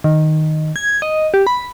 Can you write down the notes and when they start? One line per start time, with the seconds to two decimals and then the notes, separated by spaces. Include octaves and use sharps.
0.04 D#3
0.76 G#6
1.02 D#5
1.34 G4
1.47 B5